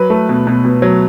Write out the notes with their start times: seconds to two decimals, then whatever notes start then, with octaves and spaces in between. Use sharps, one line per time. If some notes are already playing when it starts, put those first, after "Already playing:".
Already playing: F#3 B4
0.10 A3
0.29 B2
0.47 B2
0.65 B2
0.82 F#3